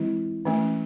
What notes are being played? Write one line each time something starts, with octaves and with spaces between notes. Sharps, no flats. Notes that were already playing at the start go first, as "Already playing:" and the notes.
Already playing: E3 G#3 C4 E4
E3 A3 C#4